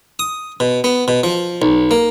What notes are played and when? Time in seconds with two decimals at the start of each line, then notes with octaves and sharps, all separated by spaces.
0.19 D#6
0.60 B2
0.84 B3
1.08 B2
1.24 F3
1.62 B1
1.91 A#3